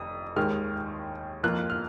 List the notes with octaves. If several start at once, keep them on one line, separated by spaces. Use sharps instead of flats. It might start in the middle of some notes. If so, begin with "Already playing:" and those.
Already playing: F1 F2 D#6
D#2 D#3 G#3 F6
F2 F3 A#3 F4 F#6
F6